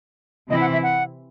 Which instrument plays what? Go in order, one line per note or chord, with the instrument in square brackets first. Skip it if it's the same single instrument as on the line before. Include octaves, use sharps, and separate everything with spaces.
[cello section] C3 E3 C4 E4 [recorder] D#5
[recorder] F#5
E5
F#5